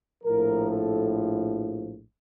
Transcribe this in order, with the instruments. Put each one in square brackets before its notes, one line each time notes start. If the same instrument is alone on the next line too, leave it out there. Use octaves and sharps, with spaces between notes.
[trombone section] A#1 A2 F3 A#4
A4